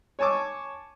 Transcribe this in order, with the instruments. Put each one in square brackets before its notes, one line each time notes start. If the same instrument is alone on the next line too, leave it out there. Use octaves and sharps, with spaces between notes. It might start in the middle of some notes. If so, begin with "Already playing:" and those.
[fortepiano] C#5 G#5 A5 C#6 D6